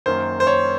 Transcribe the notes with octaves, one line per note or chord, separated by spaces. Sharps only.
F#2 D#3 A#3 C5
C5
C#5